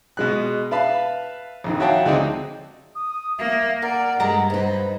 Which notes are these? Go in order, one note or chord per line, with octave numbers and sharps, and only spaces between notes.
B2 G#3 F#6
B4 E5 F5 A5 B5
A#1 F2 D#3
F#4 C#5 E5 F5 G5 A5
D2 G#3 C4 D4 D#4 D#5
D#6
A#3 E5
A#4 D5 F#5
G2 G#3 G4 A4 A#5
D#4 B4 C5